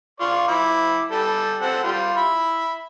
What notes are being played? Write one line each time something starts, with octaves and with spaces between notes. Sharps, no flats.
F4 D5 C#6
E4 B5 D6
G3 A4
C4 A4 F#5
G3 F4
E5 B5